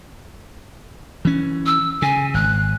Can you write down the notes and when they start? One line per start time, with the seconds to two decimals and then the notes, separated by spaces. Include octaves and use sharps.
1.25 E3 C#4
1.66 E6
2.02 C#3 G#5
2.34 G#1 F#6